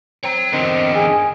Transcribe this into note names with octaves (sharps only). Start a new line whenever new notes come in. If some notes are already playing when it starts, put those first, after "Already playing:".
C4 C#5 A#5
E2 D3 D#3 C4
G#4